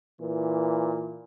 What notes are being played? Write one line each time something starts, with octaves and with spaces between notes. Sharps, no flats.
A#2 E3